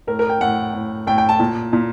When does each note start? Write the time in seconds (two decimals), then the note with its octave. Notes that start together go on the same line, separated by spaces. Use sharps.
0.07 A2 A#4
0.19 A#4
0.30 G5
0.41 A2 F#5
0.73 A2
1.07 A2 G5
1.18 G5
1.29 A5
1.39 A#2
1.73 A#2